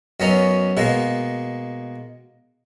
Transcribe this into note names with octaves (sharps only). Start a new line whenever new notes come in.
F#2 B3 C#4 D#4
B2 G#3 A#3